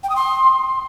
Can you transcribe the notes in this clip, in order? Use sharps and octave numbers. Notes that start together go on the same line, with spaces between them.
G5
D#6
C6